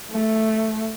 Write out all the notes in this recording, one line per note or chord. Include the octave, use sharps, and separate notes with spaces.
A3